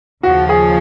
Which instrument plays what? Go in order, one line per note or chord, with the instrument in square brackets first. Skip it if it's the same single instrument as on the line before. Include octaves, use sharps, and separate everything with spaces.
[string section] D#2 C#3 F3 [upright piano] F#4
[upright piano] G#4